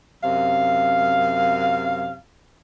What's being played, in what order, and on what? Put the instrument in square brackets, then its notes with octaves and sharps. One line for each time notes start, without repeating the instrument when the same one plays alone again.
[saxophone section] F#2 C3 F5